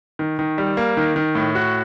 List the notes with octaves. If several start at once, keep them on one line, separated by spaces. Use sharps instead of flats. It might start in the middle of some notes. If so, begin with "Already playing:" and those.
D#3
D#3
G3
A#3
D#3
D#3
A2
F#4